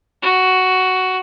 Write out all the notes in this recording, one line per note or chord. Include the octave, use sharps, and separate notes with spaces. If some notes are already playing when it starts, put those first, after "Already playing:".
F#4